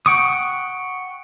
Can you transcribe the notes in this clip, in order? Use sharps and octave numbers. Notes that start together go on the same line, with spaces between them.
F#5 G5 C#6 D#6